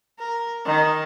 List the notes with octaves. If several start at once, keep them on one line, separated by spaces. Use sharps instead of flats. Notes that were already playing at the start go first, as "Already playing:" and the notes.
A#4
D#3